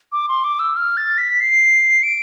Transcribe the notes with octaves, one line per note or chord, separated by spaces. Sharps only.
D6
C6
D6
E6
F6
A6
B6
C7
D7